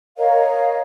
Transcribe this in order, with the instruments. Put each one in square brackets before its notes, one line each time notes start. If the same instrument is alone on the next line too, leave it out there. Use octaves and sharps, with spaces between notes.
[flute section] A#4 C#5 D#5 F5